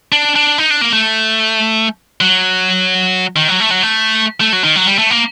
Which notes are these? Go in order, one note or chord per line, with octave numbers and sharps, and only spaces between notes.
D4
D4
D#4
D4
A#3
A3
F#3
D#3
F#3
A3
F#3
A3
A3
F#3
D#3
F#3
G3
A3
A#3